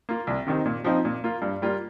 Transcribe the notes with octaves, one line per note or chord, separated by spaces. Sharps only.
A#3 F4
C2
C3 D#3 C4 D#4
A#2
F3 C4 D#4
A#2
A#3 F4
G2
G3 A#3 F4